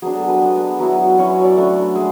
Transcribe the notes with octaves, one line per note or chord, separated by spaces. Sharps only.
F#3 B3 D4 G#4
A4
B4
G#3 B3 D4
F#3 B3 E4
F#3 C#4 E4 C#5
D5
A3 D4
G#3